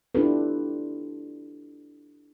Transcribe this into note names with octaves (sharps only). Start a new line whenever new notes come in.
D4 E4 F4 G4 A4 B4